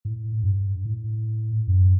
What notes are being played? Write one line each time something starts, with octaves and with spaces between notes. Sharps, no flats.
A2
G2
A2
F#2